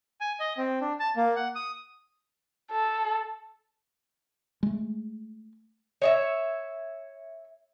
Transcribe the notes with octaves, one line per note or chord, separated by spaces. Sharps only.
G#5
D#5
C4
D4
A5
A#3
F#5
D#6
A4
G#3 A3
C#5 D#5 E5